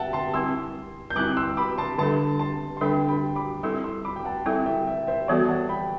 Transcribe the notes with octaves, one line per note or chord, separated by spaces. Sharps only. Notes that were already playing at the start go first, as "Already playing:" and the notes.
Already playing: E5 F#5 G5 A5
A5 C6
G3 C4 E4 C6 E6
G6
G3 C4 E4 D6 F#6
C6 E6
B5 D6
A5 C6
D3 G3 D4 A4 A5 C6
A5 C6
C6
D3 G3 D4 A4 G5 B5
G5 B5
B5 D6
G3 C4 E4 A4 C6 E6
C6 E6
B5 D6
G5
F#5 A5
G3 C4 E4 A4 E5 G5
E5 G5
E5 G5
C5 E5
E3 G3 B3 F#4 A4 D5 F#5
F#5 A5
G5 B5